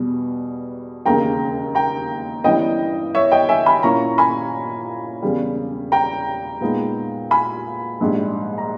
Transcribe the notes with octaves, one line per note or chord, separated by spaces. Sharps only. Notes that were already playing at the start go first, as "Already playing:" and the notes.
Already playing: E2 B2 G3
E1 D#2 C#3 G5 A#5
G5 A#5
G1 G2 E3 G3 C#4 D#5 G5
C#5 E5
D#5 G5
E5 G#5
G#5 B5
A#2 A#3 C#4 E4 A#5 C#6
G#5 B5
E1 E2 C#3 G3
G5 A#5
A#2 G#3 B3 D#4
G#5 B5
A#1 G#2 G3
A#5